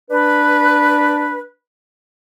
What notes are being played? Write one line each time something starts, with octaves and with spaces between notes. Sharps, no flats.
D4 B4